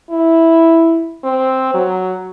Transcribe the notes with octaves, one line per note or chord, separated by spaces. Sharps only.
E4
C4
F#3